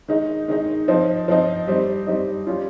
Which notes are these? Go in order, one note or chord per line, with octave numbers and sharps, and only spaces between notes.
D#3 G#3 D#4
D#3 G#3 D#4
F3 C4 D#4
F3 C4 D#4
G3 C4 D#4
G3 C4 D#4
G3 C#4 F4